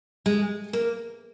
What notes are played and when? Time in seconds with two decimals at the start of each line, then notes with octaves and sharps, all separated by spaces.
0.26 G#3
0.73 A#3